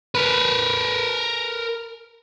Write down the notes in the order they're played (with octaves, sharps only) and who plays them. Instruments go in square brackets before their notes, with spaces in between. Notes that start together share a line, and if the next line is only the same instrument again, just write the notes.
[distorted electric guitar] A#4 B4